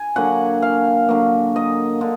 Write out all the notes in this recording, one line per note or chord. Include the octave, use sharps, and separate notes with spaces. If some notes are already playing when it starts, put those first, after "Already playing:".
Already playing: G#5
D3 F#3 A#3 F#5
F5
D3 F#3 A#3
D#5
D3